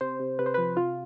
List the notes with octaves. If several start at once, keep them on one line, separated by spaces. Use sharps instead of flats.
C3 C5
C3
C3 B4
C5
B4
F3
C3 F4